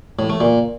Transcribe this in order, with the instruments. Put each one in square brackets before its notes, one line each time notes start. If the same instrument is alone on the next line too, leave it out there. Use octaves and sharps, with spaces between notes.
[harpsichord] A2
A3
A#2